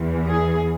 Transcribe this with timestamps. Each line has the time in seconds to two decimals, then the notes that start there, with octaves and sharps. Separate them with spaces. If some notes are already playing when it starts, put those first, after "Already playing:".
Already playing: E2 E3
0.26 G#4